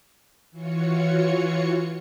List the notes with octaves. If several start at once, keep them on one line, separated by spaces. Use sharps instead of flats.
E3 F4 F#4 C#5 C#7